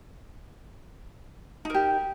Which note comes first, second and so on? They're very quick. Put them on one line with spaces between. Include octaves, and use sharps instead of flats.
D#4 A#4 G4